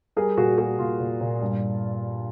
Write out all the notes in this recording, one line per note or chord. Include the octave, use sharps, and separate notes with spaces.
G3 G#4 A#4
A#2 F#4 G#4
A#3 F#4 G#4
A#2 F4
A#2
A#2
G2